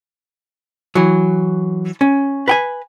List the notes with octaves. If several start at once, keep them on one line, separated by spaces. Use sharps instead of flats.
E3 F#3
C#4
B4 G5 G#5